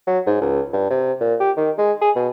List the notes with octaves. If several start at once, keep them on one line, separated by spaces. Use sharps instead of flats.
F#3
G#2
C#2
G2
C3
A#2
G4
D#3
G#3
G#4
B2